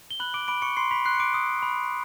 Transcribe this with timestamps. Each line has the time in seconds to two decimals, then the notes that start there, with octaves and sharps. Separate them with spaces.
0.11 G7
0.20 B5 F#6 F#7
0.34 D6 D7
0.48 B5 D6 D7
0.62 C#6 C#7
0.77 B5 C6 C7
0.91 B5 B6
1.05 C6 F#6 C7
1.15 C#7
1.20 D6 D7
1.34 D#6
1.63 B5